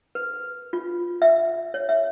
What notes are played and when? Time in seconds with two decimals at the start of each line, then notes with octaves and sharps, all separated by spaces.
0.15 B4
0.73 F4
1.22 E5
1.74 C#5
1.89 E5